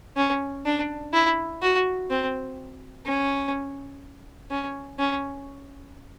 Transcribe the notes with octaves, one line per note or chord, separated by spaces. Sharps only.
C#4
D4
E4
F#4
C4
C#4
C#4
C#4